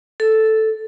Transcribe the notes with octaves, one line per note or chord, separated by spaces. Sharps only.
A4